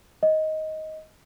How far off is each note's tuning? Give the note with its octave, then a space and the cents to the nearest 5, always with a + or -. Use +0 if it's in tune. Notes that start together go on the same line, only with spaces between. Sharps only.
D#5 +10